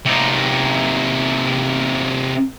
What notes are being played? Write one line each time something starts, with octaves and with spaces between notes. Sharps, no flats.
C3 D#4